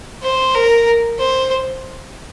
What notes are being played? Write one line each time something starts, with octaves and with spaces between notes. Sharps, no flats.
C5
A#4
C5